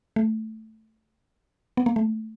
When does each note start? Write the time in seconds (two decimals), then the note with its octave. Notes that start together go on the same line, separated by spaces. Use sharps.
0.16 A3
1.77 B3
1.86 A#3
1.96 A3